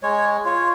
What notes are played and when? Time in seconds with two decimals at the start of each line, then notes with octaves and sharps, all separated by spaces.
0.03 G#3 C#5
0.45 F4 C#5